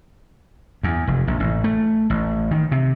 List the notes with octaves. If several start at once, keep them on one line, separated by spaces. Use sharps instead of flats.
E2
F1
A#1
A1
A3
A1
D#3
C3